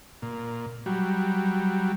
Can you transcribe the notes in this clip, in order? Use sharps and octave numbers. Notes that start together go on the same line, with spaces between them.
A#2
F#3 G3